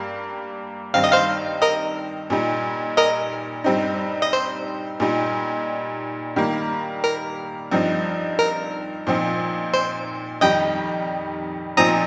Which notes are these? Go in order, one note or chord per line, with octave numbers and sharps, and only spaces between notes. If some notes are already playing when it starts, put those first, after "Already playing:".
Already playing: G2 G3 A#3
G2 D#3 C4 D#4 F5
D#5
C5 F5
A#4 D#5
A#2 G3 D#4
A#4 D#5
G2 G3 C4 D#4
D#5
C5
A#2 G3 D#4
D#3 G3 A#3
A#4
G2 F3 C4 D#4
A#4
A#2 F3 C4 D#4
C5
F2 D#3 G3 D#4 D#5 G5
A#2 F3 C4 D#4 A#5 D#6